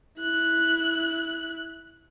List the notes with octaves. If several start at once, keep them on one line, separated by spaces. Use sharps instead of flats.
E4 F#6